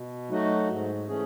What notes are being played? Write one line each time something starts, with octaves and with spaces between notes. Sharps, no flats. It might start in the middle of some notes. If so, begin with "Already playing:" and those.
Already playing: B2
F#3 A3 D#4 F#4
G#2
E3 A3 C#4 G#4